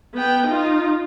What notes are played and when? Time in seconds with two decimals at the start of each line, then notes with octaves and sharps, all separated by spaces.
0.14 B3 G5
0.47 D#4 F4